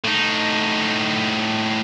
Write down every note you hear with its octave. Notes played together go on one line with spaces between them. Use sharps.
A2 D#4